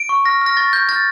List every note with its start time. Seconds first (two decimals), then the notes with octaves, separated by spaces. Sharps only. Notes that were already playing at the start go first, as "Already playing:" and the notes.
Already playing: D7
0.09 C#6
0.25 F6 A#6
0.42 F6 A#6
0.57 C#6 A6
0.73 C#6 G6
0.88 F6 A6